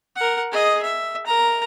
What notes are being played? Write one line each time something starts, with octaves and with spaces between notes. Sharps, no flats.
A#4 F#5
G#4 D#5
E5
A#4 A#5